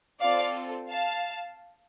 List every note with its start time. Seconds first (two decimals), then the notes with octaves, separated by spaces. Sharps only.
0.20 C4 F4 A4 D5 F5
0.90 F5 A5